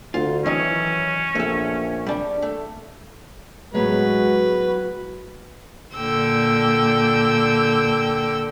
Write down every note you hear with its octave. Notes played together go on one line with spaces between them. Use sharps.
D2 F4
D#3 E3 F#3 C#4
A#1 A3 E5
G3 D4
A3
A2 F#3 G#3 B3 F#4 B4
A#2 D3 G5 E6